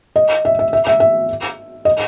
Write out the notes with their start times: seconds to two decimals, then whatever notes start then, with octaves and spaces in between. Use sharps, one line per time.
0.16 D#5
0.45 E5
0.59 E5
0.73 E5
0.87 E5
1.00 E5
1.85 D#5